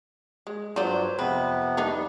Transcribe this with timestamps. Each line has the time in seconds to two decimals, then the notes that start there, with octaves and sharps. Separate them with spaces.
0.47 G#3
0.76 G2 F#3 F4 C5 D5
1.19 F2 C3 B3 C4 B4
1.77 G3 D4 D#4